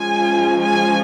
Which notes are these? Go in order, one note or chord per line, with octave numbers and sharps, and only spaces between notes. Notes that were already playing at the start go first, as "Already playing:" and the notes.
Already playing: F3 G#3 C#4 F4 G#5
G#5